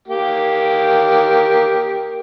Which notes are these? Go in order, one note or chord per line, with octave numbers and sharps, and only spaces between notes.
A#3 G4